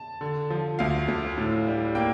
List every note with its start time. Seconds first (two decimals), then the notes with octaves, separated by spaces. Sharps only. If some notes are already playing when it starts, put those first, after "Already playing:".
Already playing: A5
0.21 D3
0.50 F3
0.79 D2 F5
1.08 D2
1.38 A2
1.67 G3
1.95 A#3 G5